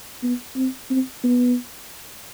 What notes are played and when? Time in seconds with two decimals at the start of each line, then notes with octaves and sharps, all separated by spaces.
0.23 B3
0.56 C4
0.90 C4
1.24 B3